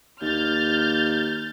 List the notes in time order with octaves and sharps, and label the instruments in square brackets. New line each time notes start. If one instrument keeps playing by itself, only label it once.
[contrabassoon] D#2 [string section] F6 G6 A6